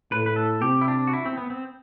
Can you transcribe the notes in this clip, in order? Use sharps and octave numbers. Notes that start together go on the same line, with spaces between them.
A2 B4
B4
A4
C3 G4
E4
D4
F#4
E4
C4
B3
C4